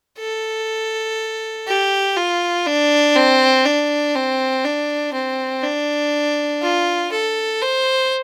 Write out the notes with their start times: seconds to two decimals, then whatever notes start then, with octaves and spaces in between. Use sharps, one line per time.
0.18 A4
1.67 G4
2.16 F4
2.66 D4
3.15 C4
3.65 D4
4.15 C4
4.64 D4
5.13 C4
5.63 D4
6.62 F4
7.11 A4
7.61 C5